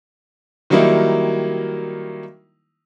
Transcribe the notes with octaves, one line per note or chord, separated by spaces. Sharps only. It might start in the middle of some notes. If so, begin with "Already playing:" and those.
D#3 F#3 G3 A#3 D#4 E4